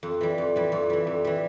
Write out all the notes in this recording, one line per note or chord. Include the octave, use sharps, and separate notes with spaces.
F2
E3 G3
F2
E3 G3
F2
E3 G3
F2
E3 G3